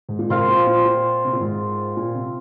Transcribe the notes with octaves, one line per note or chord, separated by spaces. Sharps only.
G#2
A#2
G#2 C3 C4 F4 A#4 F5
A#2
A#2
A#2
C3
A#2
G#2
A#2
C3